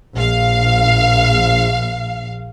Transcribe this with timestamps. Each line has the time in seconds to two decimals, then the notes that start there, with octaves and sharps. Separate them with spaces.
0.15 A#1 F5